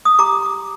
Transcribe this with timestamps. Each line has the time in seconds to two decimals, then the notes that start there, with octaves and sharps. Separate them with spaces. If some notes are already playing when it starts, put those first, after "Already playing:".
0.05 D#6
0.19 G4 A#5 D6